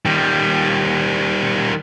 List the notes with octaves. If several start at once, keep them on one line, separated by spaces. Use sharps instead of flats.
D#3 G3